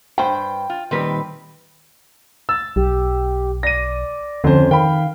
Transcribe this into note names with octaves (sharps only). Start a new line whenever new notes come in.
G2 B4 C5 G5
F4
A#2 D#3 G3 C4 B4
E6 A6
B1 G4
D5 A#6 D#7
F2 D3 C#4 C5
D#3 F5 G5 B5